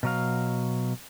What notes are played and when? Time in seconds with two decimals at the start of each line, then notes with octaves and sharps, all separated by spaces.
0.03 B2 F#3 F5